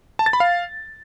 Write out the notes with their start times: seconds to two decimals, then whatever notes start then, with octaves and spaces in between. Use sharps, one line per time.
0.19 A5
0.26 A6
0.33 B5
0.40 F5